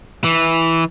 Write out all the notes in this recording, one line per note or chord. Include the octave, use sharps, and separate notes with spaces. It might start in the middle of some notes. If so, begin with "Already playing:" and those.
E3